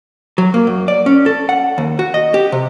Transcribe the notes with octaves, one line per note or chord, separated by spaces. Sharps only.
F#3
A#3
F#2
D5
C#4
A4
F#5
D#2
F#4
D#5
G4
C3